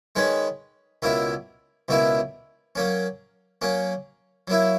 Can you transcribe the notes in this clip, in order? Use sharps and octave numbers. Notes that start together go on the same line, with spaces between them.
D#3 G#3 C#4 G#4 B4
C#2 B2 A#3 E4
C#2 B2 A#3 E4
F#3 A#3 C#4
F#3 A#3 C#4
F#3 A#3 E4